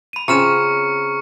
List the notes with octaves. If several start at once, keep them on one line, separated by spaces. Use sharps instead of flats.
B5 D#7
C#3 C4 F4 A#5 C#6 F6 C#7 E7